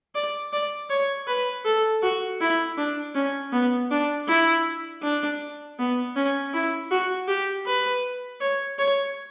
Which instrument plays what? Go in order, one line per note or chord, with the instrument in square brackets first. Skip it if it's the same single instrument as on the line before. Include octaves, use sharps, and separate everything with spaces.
[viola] D5
D5
C#5
B4
A4
F#4
E4
D4
C#4
B3
D4
E4
D4
B3
C#4
E4
F#4
G4
B4
C#5
C#5